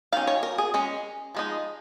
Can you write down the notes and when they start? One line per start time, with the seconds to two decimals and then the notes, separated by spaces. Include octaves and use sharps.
0.12 D#3 C#4 F5
0.27 C#5
0.43 A#4
0.58 G#4
0.74 G#3 C#4
1.35 F3 G#3 D#4